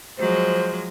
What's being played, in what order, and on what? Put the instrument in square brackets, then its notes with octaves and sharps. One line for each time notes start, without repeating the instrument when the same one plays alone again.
[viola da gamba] F3 F#3 G#3 [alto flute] C5